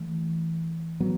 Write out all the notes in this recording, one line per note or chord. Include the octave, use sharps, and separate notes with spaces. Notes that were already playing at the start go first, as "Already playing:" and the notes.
Already playing: E3 A3
A2 F#3 B3